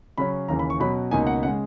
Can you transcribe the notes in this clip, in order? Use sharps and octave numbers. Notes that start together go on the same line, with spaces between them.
C#3 F#3 C#4 B5
D#2 C#3 E3 A#5
B5
C#6
B2 F#3 C#4 B5
C#2 B2 A#3 D#4 G#5
F#5
C#3 G#3 F#5